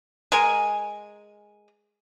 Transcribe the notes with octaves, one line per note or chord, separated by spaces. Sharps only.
G#3 A#4 G#5